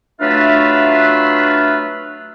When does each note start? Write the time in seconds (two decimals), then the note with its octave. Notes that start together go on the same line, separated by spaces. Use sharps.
0.20 F#3 A3 D4 F4 B4 E5